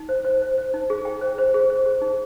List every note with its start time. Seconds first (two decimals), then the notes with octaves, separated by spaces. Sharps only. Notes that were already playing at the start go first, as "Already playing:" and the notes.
Already playing: D#4
0.09 C5
0.25 C5
0.42 C5
0.58 C5
0.74 D#4
0.90 G#4
1.05 G5
1.21 C5
1.38 C5
1.54 G#4
1.70 C5
1.86 G#4
2.02 D#4